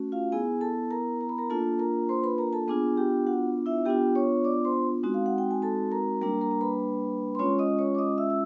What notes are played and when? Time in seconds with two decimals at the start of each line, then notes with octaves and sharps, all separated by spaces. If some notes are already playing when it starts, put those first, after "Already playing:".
Already playing: A3 C#4 F#4
0.12 F4 F5
0.32 B3 E4 G#4 G#5
0.61 A4 A5
0.91 A#4 A#5
1.21 A#5
1.29 B5
1.38 A#4 A#5
1.50 A#3 D4 F4 A4 A5
1.79 A#4 A#5
2.09 C5 C6
2.24 B4 B5
2.38 A#4 A#5
2.53 A4 A5
2.68 B3 D4 F4 G#4 G#5
2.97 G4 G5
3.27 F#4 F#5
3.66 E4 E5
3.85 B3 D4 F4 G4 G5
4.15 C#5 C#6
4.44 D5 D6
4.65 C5 C6
5.03 G#3 C4 D#4 F#4
5.14 F5
5.26 F#5
5.38 G5
5.51 G#5
5.62 A4 A5
5.92 A#4 A#5
6.21 G3 A#3 D4 A#4 A#5
6.41 A#4 A#5
6.51 A#5
6.61 B4 B5
7.35 C6
7.39 G#3 C#4 F4 C#5 C#6
7.59 D#5 D#6
7.79 C#5 C#6
7.95 D6
7.98 D#5 D#6
8.18 E5 E6
8.30 E6